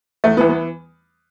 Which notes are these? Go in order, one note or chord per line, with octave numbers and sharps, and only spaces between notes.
E2 A3
B3
E3
B3